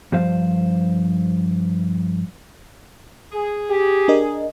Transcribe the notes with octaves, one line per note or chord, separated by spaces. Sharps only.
G2 F3 C5 F5
G#4
G4
D4 A#4 D#5